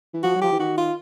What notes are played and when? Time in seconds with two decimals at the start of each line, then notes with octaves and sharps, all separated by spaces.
0.14 E3
0.23 F3 F#4
0.35 F#3
0.42 F3 G4
0.52 E3
0.59 D#3 F#4
0.78 F4